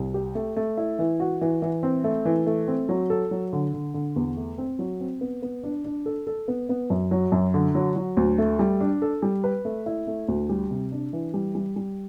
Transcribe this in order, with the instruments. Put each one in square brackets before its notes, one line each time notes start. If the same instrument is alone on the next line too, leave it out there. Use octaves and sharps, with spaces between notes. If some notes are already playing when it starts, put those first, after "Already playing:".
Already playing: [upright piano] C2
G4
A3
A3
E4
E3
F#4
E3
E3
C4
A3
E3
A3
C4
F#3
A4
F#3
D3
D3
D3
E2
A3
C4
F#3
C4
B3
B3
D4
D4
A4
A4
B3
B3
F#2
F#3
F#2
D3
F#3
F#3
D2
A3
G3
D4
A4
G3
B4
A3
E4
A3
D2
G3
C3
D4
E3
G3
G3
G3